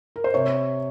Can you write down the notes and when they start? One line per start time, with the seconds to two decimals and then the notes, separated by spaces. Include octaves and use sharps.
0.16 A#4
0.24 C5
0.34 C3 C#5